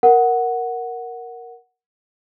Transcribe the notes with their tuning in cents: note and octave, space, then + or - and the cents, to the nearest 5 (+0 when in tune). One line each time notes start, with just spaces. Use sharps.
A#4 +0 F#5 +0